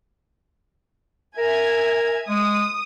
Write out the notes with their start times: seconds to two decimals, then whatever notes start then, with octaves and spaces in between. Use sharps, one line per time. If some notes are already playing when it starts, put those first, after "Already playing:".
1.38 A#4 E5 G#5 G#6
2.28 G#3 D#6